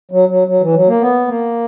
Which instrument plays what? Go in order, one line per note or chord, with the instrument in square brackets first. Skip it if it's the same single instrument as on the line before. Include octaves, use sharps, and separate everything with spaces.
[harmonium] F#3
F#3
F#3
E3
F#3
A#3
B3
A#3